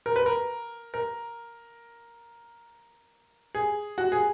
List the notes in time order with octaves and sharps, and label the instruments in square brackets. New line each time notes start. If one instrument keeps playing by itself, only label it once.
[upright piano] A#4
B4
A#4
A#4
G#4
F#4
G#4